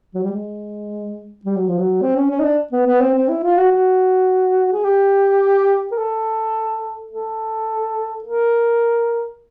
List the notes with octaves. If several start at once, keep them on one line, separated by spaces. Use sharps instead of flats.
F#3
G3
G#3
G3
F#3
F3
F#3
C4
C#4
C#4
D#4
D4
B3
B3
C4
C4
E4
F4
F#4
F#4
G#4
G4
A#4
A4
A4
A#4